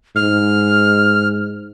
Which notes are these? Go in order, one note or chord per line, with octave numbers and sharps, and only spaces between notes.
G#2 F6